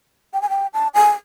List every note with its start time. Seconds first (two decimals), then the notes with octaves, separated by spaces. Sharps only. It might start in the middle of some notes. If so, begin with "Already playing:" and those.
0.33 G5
0.42 G#5
0.50 G5
0.74 A5
0.94 G#5